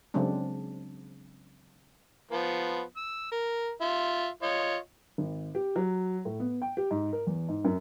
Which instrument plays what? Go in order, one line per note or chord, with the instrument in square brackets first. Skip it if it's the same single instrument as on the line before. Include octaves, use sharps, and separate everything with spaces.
[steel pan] C#3 F#3 G#3 C4 D4
[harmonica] F3 B3
E6
A#4
F4 E5
F4 C#5 D#5
[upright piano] G#1
G4
F#3
A2
B3
G5
G4
G#2
A#4
E2
G#2
F#2